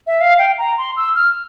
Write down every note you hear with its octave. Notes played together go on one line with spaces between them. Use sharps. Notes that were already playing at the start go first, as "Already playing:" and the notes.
E5
F5
G5
A#5
C6
E6
F6